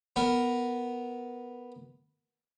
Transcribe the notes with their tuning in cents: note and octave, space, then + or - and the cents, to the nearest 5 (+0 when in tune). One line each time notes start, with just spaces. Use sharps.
B3 +0 A#4 +0